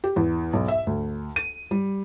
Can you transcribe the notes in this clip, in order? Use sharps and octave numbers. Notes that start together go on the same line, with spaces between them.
G4
E2
B1
E5
D2
D#7
G3